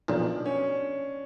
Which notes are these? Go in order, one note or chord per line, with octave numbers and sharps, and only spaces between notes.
B1 A#2 F3 D4
C#4